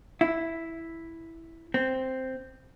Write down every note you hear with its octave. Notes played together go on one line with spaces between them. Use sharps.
E4
C4